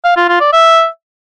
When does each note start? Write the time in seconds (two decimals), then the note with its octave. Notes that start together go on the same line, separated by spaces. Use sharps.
0.05 F5
0.17 F4
0.29 F4
0.41 D5
0.53 E5